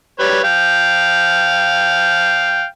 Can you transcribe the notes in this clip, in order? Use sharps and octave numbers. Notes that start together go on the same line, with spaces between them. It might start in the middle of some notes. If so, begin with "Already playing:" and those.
G3 B4 C#5
F5 G5